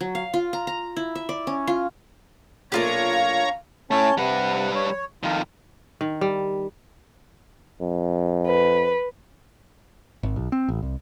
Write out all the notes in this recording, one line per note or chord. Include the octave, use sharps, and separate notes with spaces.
F#3
F5
F4
A#5
A#5
E4
E5
D5
C#4
F4
B1 A#2 A#3 D4 F4 G4 C#5 A#5
F5
A3 C#4 E4 C#5 A5
C3 G3 B4 F#5
C#5
F2 D#3 F4
D#3
G3
F2
B4
G#1
B1
C4
A1
C2